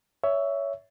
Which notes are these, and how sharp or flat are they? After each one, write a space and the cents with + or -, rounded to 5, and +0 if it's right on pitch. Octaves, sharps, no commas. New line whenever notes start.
C#5 +15 E5 +0